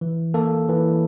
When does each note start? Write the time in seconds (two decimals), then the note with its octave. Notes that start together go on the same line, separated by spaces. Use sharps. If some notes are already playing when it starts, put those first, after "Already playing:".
0.01 E3
0.34 A#3 A4
0.69 E3